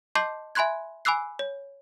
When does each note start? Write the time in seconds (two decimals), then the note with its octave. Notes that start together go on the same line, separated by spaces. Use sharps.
0.15 D#5 A5 C6 D6 G6 C7
0.55 E5 G#5 B5 C6 F#6 G#6
1.05 G#5 B5 D6 E6 F#6 C7
1.39 C#5